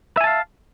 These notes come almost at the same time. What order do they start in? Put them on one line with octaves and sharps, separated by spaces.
E5 G#5 A5 F5